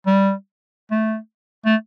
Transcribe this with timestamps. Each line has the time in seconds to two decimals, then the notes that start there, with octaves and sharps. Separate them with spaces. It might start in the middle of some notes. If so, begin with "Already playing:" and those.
0.07 G3
0.91 A3
1.66 A3